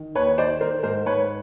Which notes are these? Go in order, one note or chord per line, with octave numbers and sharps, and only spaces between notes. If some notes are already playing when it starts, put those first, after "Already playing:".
Already playing: D#3
D#2 B4 C#5
D#3 C5 D5
D#3 A#4 C5
G#2 A#4 C5
G#2 B4 C#5